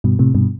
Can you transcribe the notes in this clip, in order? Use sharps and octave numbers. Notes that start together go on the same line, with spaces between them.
G2 B2
A2 C3
G2 B2